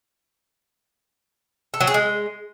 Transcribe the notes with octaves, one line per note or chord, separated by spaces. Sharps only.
A4
F#3
G#4
G#3